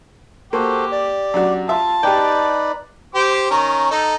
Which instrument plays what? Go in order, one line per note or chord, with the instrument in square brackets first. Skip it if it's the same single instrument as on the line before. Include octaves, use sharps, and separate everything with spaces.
[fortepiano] A#3 [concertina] F#4 A4 C5 [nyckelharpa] G4
[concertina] D5
[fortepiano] F#2 D4 F#4
[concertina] F4 [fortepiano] E5 [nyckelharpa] A5
[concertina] D#4 B4 D5 [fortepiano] G4 G5
[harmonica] G4 C5 D6
D#3 C#4 A#5
D#4 A4